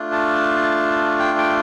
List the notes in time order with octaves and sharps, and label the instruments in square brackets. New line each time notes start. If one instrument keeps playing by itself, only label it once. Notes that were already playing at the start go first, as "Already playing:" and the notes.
Already playing: [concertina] A3 D4 F4
A5
G5
G5